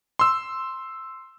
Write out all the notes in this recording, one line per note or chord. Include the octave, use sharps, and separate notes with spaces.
C6 E6